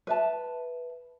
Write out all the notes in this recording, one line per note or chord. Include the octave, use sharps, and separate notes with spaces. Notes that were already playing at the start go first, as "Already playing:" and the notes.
B4 E5 A5